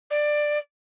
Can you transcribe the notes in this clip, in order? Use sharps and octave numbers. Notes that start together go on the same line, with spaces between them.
D5